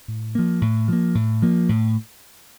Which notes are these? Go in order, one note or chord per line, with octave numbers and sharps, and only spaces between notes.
A2
F3 A#3
A2
F3 A#3
A2
F3 A#3
A2